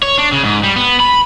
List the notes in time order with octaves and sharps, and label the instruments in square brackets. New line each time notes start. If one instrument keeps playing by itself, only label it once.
[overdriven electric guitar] C#5
D4
C#3
G#2
G3
B3
B5